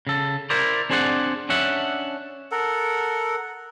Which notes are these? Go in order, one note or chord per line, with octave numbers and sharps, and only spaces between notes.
C#3 A4
E4 A#4 C5 D5
C4 D4 G#4 C5 D5 F#5
C#4 D4 C#5 E5 F#5
A4 A#4 F#5